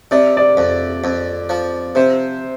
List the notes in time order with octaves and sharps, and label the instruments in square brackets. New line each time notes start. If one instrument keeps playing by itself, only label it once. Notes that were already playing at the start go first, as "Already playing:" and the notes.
[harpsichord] C3 [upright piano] D5
[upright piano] D5
[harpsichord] F2
F2
F3
[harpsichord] C3 [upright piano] C5